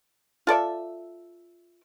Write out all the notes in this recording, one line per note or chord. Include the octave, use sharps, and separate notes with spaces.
F4 A4 D5 E5